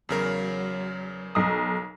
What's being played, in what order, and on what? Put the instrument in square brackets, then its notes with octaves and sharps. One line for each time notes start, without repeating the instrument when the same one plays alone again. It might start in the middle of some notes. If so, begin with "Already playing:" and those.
[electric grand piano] E2 C#3 A#4 [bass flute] F#3
[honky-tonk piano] B1 D#6